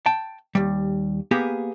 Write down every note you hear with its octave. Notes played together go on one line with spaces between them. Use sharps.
G5 A5
D#2 G3
A#3 B3 G4 G#4